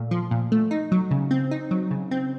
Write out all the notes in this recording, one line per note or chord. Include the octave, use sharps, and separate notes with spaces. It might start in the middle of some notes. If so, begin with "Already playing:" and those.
Already playing: A#2 A3
F3
A#2
A3
D#4
F#3
C#3
C4
D#4
F#3
C#3
C4